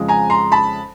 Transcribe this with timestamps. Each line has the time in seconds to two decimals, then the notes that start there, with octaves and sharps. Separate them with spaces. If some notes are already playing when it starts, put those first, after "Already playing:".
Already playing: F2 C#3 F3 G#3
0.08 G#5 A#5
0.30 A#5 C6
0.52 A5 B5